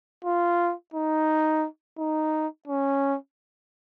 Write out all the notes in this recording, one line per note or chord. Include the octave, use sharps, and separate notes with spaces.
F4
D#4
D#4
C#4